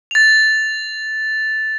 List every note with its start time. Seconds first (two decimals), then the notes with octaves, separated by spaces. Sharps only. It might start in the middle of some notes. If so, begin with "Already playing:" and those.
0.11 A6 F7